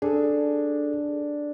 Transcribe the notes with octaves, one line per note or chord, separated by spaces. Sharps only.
D4 G#4 A4